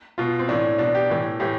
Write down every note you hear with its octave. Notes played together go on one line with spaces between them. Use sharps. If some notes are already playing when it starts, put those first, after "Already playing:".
B2 F4
C4
A2 E3 D4
B2 D4
G4
A2 E3
A2 E3 G4